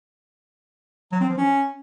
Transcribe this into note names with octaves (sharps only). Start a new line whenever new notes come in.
F#3
C4
F3
C#4